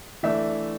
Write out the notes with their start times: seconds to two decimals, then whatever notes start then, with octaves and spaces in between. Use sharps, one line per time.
0.23 E3 A3 D4 E5